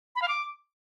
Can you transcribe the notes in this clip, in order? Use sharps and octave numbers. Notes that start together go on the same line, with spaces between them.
B5
F5
D6